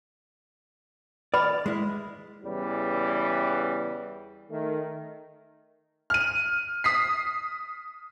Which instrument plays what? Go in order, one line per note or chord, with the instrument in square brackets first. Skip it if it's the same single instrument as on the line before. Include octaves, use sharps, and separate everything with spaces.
[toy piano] B4 B5 [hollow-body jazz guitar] D5
[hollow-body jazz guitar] G#3 E4
[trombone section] E2 C#3 E3 G3
D#3 A3
[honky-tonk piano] F6 D#7
D#6 B6 C7